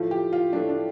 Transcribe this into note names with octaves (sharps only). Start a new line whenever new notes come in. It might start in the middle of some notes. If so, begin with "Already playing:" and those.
Already playing: A2 F3 A3 F4
G4
F4
A2 F3 A3 D4
D4